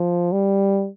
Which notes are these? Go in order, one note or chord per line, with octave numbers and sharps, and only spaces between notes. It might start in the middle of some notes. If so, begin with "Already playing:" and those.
Already playing: F3
G3